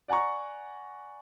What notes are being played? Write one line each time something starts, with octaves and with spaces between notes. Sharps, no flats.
D5 F#5 G#5 A#5 C#6